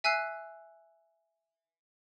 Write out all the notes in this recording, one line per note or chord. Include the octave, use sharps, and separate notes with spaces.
E5 G#5 E6 F#6 C7